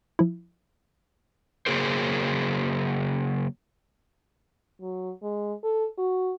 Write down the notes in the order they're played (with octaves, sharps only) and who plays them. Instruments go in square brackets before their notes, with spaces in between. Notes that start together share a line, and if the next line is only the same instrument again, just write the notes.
[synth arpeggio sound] F3 E4
[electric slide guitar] C#3 F#3 A#3 G#4 A#4 C5
[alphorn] F#3
G#3
A4
F#4